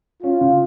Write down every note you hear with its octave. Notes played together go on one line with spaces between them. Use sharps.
C#4 F4
C#3